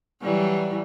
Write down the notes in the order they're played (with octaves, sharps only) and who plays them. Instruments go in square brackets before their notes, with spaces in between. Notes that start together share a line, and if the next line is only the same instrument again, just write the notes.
[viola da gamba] E3 F#3 G3